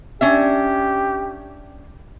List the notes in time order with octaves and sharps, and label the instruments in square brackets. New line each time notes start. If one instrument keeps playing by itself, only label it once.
[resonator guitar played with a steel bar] C#4 D4 E5 [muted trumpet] G4